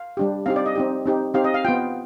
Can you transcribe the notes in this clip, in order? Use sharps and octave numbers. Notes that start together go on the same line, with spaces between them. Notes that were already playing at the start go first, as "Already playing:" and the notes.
Already playing: F5
G3 D4 G4
C4 D#4 G4 F5
D5
D#5
C4 D#4 G4
C4 D#4 G4
C4 D#4 G4 F5
D#5
F5
B3 F4 G5